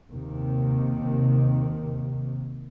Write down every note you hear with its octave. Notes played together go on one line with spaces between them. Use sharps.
D#2 C3 D#3